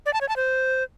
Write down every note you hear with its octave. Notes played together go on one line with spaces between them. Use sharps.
D5
A5
C#5
A5
C5